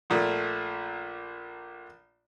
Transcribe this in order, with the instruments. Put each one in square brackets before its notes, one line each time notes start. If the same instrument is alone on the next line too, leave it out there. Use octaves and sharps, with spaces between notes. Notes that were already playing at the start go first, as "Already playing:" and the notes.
[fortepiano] A#1 A#2 A3